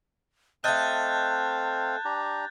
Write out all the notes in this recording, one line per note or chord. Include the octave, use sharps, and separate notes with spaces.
A3 C4 D#5 F5 A5 F#6 G6 A6
D4 G4 A#5